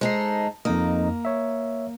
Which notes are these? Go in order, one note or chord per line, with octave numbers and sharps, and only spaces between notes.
G#3 D#4 A4 C5 C7
F2 A#3 D#4 D#5
C#5 E5